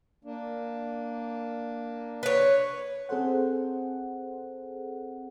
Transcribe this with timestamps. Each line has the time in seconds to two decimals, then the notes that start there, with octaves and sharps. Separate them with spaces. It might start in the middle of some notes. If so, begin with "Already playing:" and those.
0.24 A#3 D4
2.23 B4 C#5
3.09 C4 G#4 A4 C5 F#5